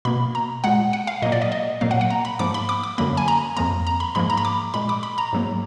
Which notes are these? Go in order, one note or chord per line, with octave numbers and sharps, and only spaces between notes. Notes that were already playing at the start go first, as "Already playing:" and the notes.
B2 A#3 B5
A#5
A#2 G#3 F#5
F#5
F5
A#2 F#3 A#3 D#5
D5
D#5
D#5
A#2 F#3 A#3 F5
F#5
F#5
A#5
B5
G#2 F3 A#3 D6
B5
D6
D6
F#2 D3 F#3 A#3 B5
G#5
A#5
F2 F3 A#3 A#5
A#5
B5
G#2 F3 A#3 B5
A#5
B5
D6
A#2 G#3 B5
D6
B5
A#5
G#2 F#3 A#3